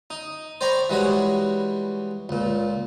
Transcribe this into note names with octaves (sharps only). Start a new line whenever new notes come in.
D#4
C5 D5 G5 A#5 B5 C#6
E3 G3 G#3 F#4 C#5
C#2 A#2